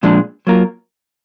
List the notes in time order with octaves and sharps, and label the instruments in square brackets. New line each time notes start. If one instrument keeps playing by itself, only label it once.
[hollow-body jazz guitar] A#2 F3 G#3 D4
F#3 A#3 F4 A#4